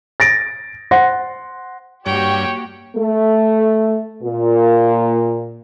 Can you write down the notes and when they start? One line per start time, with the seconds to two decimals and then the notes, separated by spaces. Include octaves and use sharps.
0.20 A6 A#6 D7
0.91 C5 F#5 C6 A#6
2.06 G2 A#3 F#4 G4 C#5 G5
2.95 A3
4.22 A#2